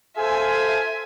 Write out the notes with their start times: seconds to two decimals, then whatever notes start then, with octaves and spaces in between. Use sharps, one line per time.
0.17 F4 A4 C5 E5 G#5